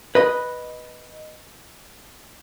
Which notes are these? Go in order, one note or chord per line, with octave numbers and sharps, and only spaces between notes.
B4 D#5 B5